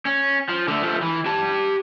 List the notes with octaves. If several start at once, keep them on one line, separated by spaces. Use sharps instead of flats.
C#4
F3
D3 A3
F3 A3
E3
G4 A5